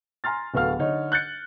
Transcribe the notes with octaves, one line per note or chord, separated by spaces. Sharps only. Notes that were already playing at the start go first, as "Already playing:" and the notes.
G#5 A#5 C6 F6 A6
D1 B3 F#4 A4 F5 F6
D3 D#4 C#5
F#6 G6 A6 C#7